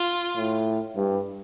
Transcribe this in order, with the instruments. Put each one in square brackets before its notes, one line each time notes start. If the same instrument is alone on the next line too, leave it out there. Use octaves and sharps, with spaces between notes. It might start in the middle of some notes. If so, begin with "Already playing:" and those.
Already playing: [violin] F4
[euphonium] A2
G2